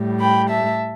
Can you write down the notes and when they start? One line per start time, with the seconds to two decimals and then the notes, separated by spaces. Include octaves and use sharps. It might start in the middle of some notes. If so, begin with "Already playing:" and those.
Already playing: A2 G3
0.20 G5 B5
0.50 E5 A5